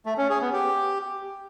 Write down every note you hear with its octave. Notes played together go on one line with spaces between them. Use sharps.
A3
C#4
G#4
B3
G4